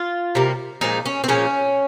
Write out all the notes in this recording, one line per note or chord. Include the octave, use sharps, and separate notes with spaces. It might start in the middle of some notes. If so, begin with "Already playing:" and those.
Already playing: F4
C3 G3 A#3
A#2 F3 G#3 D#4
C#4
C4
A#2 F3 G#3 C#4